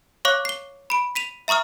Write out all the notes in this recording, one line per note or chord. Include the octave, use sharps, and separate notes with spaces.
C#5 F5 C#6 D6 F#6
C7 G7
B5 D7
B6 D#7 F7
E5 A#5 C#6 D#6 F6